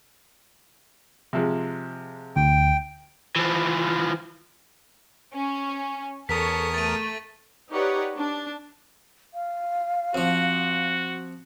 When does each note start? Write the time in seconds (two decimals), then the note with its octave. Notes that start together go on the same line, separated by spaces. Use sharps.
1.33 C3 F3 G#3
2.36 D2 G5
3.36 E3 F3
5.33 C#4
6.29 E2 A4 A#4 C#5 D#6 B6
6.74 A3 A6 D#7
7.71 D#4 G4 B4 C#5 D5 F#5
8.16 D4
9.34 F5
10.15 F2 F3 F#4